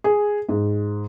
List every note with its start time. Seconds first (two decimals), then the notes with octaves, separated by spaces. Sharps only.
0.04 G#4
0.49 G#2